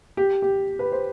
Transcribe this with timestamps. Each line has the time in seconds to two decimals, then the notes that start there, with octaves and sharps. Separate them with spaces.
0.17 G4
0.42 G4
0.79 B4
0.92 C5